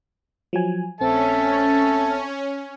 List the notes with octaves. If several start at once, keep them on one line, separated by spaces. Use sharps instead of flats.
F3 F#3 G#5
A#1 C4 C#4 A4 E5 A5